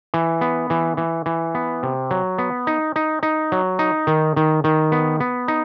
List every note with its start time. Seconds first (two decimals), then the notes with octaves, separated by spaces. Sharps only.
0.14 E3
0.41 B3
0.70 E3
0.97 E3
1.26 E3
1.55 B3
1.83 C3
2.11 F#3
2.38 B3
2.67 D#4
2.96 D#4
3.23 D#4
3.52 F#3
3.79 D#4
4.07 D#3
4.36 D#3
4.64 D#3
4.92 B3
5.20 B3
5.48 D#4